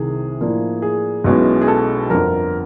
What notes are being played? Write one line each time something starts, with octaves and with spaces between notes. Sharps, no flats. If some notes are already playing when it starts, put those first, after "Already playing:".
Already playing: C2 C3 D#3 G#4
A2 F3 A#3 D4
G#4
B1 B2 G#3 C#4 E4
G#4
A4
G1 F2 D3 A#4